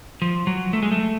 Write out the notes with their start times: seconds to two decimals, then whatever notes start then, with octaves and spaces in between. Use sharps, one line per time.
0.22 F3
0.47 F#3
0.73 A3
0.83 G#3
0.91 A3